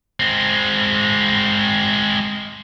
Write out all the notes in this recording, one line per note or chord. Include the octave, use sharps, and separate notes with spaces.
G#3 C4